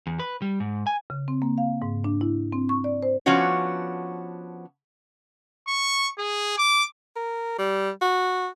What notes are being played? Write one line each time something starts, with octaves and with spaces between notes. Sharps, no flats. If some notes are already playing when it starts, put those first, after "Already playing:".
E2
B4
G3
G#2
G#5
C#3
C4
A#3
F5
G#2
D4
E4
C4
C#6
D5
C5
F3 B3 C#4 D4 F#4 C#5
C#6
G#4
D6
A#4
G3
F#4